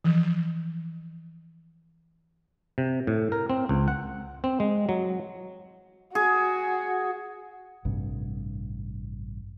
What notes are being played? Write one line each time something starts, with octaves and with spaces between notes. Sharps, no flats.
E3 F3
C3
A2
A#4
C4
C#2
F#5
C4
G#3
F#3
F#4 G#4
A1 G2 C3